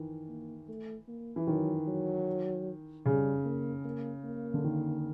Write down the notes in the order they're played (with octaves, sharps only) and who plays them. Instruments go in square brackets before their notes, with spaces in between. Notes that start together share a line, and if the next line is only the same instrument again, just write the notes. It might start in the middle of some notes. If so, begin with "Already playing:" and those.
Already playing: [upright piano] D#3 E3
[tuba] A#3
A3
A#3
[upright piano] E3
[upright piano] D#3 [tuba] F#3
[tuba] F#3
[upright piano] C#3 [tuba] G3
[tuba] A#3
A#3
A#3
[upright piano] D3
D#3